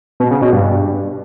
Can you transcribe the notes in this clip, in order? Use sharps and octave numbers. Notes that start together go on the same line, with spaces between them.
B2
C#3
B2
G2